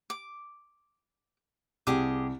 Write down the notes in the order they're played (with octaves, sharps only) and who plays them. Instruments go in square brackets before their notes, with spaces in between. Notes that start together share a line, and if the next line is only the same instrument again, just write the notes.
[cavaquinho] D6
[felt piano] C2 [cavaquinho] G4 G#4 D6